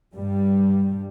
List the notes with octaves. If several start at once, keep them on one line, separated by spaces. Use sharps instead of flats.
G2 G3